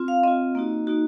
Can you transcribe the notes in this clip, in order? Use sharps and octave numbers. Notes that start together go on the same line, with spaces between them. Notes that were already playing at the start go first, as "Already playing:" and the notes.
Already playing: C4 F4
F5
C4 F4 D#5
A#3 D#4 F#4
A#3 D#4 F#4